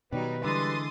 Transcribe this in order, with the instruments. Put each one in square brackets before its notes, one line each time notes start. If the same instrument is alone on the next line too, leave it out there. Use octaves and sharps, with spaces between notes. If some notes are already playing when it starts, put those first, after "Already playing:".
[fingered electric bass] B2 D#3 B3 [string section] F#3 G3 D#4 [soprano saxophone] B4
[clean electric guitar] D3 E3 G#3 [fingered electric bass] G3 [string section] C6 D#6 A6